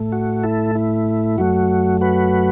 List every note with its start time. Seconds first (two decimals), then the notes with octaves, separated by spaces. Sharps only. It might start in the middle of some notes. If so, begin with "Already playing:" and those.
Already playing: A2 A3
0.12 F#4
0.43 E4 A4
0.75 E4
1.38 F#2 F#3 A3 F#4
2.01 F#4 B4